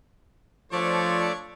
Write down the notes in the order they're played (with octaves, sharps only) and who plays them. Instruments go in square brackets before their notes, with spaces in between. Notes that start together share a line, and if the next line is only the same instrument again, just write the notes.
[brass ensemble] F3 [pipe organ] A3 D5 [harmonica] D4 C#5 C#6